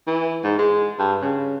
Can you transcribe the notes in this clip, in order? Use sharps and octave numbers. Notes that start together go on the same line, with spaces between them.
E3
G#2
G#3
G2
C#3